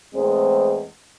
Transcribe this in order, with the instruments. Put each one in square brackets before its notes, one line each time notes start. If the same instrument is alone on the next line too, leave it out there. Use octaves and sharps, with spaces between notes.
[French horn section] E2 A2 G#3 C4